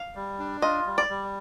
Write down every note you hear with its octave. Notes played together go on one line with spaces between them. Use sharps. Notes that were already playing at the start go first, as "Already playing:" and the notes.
Already playing: F5
G3
D4
F4 D#5
G3
D5
G3